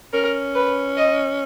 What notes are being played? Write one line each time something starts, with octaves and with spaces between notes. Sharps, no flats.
C#4 A#4
B4
D#5